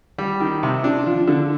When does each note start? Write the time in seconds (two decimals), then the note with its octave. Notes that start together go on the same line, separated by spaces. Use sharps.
0.18 G3
0.40 D#3
0.63 C3
0.84 D4
1.06 F3
1.28 D3